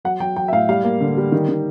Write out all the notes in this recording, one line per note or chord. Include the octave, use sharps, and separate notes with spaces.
F#3 F#5
F#3 G5
F#3 G5
E5
A2 F5
G3 F5
A#3
D3
G3
D#3
D#3